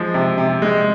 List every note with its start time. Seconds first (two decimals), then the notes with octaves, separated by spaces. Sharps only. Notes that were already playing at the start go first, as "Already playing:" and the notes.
Already playing: F3 G#3
0.14 C3
0.38 C3
0.62 G#3